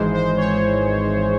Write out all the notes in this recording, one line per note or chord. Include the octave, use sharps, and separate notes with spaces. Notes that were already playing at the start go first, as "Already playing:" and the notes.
Already playing: G#1 G#2 E3 G#3 C5
C5
C#5